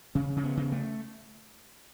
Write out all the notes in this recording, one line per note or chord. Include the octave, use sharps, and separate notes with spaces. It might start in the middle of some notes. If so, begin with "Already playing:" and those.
C#3 C#4
C#3
B3
C#3
A3